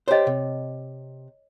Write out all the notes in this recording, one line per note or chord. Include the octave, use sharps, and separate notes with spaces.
G4 C5 C#5 D#5
C3